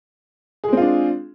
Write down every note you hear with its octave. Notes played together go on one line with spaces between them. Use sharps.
G#3 C4 D4 F4 G#4